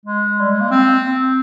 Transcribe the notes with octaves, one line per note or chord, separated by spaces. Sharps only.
G#3
G3
G#3
A#3
C4